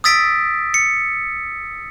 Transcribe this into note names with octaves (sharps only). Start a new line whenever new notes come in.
D#6 E6 A6 B6 D7
C#7